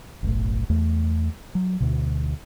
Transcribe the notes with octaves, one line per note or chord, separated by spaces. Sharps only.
F#1 B1 A2
E2 A3
F#3
D2 B2